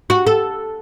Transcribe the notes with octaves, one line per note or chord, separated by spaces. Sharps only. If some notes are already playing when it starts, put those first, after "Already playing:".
F#4
A4